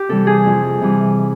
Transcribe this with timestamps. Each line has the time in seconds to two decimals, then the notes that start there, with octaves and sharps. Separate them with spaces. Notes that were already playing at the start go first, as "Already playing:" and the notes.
Already playing: G4
0.09 C3 E3 G3 A4
0.27 G#4
0.46 F2
0.81 C3 E3 G3